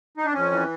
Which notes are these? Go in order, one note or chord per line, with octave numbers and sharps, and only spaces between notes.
D#4
D4
F2 C#4
E3